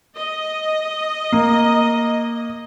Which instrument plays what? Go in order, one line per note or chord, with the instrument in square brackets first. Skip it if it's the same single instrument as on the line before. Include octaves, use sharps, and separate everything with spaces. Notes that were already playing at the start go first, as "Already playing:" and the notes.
[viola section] D#5
[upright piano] A#3